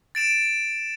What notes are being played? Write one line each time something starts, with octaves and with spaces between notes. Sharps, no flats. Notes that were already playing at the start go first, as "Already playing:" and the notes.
A6 D7 E7